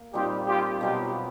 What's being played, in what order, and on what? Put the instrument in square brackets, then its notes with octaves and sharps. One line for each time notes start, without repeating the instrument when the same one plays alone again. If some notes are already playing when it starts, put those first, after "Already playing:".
Already playing: [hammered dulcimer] A#3
[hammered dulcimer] A#2 G3 C4 D#4 [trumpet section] F4 G4
[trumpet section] F4 G4
[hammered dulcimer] B2 F#3 B3 [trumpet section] F4 G4